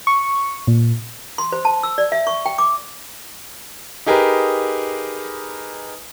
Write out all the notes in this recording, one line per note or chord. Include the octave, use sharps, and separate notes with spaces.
C#6
A#2
C6
C5
A5
E6
D5
E5
C#6
G5
D6
D#4 G4 G#4 A#4 B4